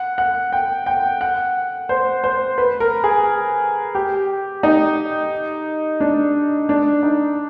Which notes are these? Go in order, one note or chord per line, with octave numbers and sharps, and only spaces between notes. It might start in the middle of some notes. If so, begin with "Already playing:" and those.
Already playing: F#5
F#5
G5
G5
F#5
C5
C5
B4
A#4
G#4
G4
D#4
D4
D4
D#4